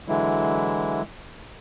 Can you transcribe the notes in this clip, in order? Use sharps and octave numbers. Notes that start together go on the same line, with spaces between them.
D3 E3 F#3 G#3 E4